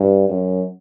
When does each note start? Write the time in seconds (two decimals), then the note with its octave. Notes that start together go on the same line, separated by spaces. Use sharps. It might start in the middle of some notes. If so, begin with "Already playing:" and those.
Already playing: G2
0.29 F#2